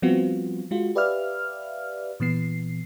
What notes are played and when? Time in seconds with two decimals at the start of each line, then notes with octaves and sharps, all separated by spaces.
0.02 F3 G3 B3 C4 F4 F#4
0.71 G#3 F4 F#4
0.95 G4 B4 D5 E5 F5 F6
2.20 A#2 E3 B3 C7